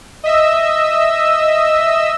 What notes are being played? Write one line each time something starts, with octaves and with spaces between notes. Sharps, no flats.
D#5 E5 E6